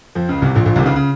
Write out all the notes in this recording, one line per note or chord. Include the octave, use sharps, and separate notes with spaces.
F2 F3
C#2 C#3
C2 C3
A#1 A#2
A#1 A#2
C2 C3
D#3
C#2 C#3
C#3